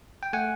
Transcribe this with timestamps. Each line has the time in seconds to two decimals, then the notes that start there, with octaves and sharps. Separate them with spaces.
0.23 G5
0.33 A3 F#5 G#5